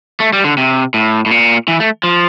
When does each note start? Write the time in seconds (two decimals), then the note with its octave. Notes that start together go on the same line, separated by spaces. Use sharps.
0.20 A3
0.33 G3
0.44 D3
0.58 C3
0.94 A2
1.26 A2
1.31 A#2
1.68 E3
1.80 A3
2.04 F3